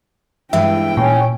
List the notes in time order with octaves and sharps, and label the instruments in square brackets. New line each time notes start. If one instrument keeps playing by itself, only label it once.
[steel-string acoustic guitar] G2 E3 G#3 [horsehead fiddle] E4 G5 [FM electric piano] E5
[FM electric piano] A#2 [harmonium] C#4